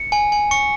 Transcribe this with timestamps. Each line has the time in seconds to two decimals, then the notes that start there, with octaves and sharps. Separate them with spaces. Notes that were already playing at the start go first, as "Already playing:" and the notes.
Already playing: C#7
0.12 G#5
0.32 G#5
0.51 C#6 C#7